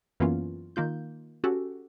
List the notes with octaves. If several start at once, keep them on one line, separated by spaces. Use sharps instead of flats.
F#2 E3 A#3 B3 C#4 F4
D#3 A#3 F4 G6
C#4 F#4 G4 A4